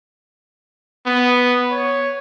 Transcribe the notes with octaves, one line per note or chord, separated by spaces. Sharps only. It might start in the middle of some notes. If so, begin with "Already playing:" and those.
B3
C#5